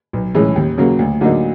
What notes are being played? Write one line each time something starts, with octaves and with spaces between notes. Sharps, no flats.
B1
A2 E3 G#3 C#4
D#2
C#3 F#3 A#3
D2
D3 F#3 A#3 D#4